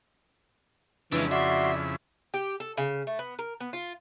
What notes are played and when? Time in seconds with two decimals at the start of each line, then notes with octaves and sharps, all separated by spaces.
1.12 F2 C#3 E3 G#3 D4 E4
1.31 F#4 D5 E5 C6
2.34 G4
2.60 A4
2.77 C#3
3.07 A3
3.19 B3
3.39 A#4
3.60 B3
3.73 F4